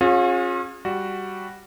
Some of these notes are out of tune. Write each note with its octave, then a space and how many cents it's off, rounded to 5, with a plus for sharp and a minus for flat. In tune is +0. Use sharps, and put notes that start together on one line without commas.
C#4 -30 F4 +40 G#4 +0
G3 +0 F#4 +0